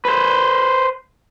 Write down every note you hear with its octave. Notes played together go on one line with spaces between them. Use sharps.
B4 C5